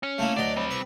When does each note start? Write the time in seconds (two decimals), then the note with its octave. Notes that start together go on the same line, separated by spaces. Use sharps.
0.03 C#4
0.18 A3 A#3 E4
0.37 D2 F#3 D5 D#5
0.57 G3 C4
0.71 B4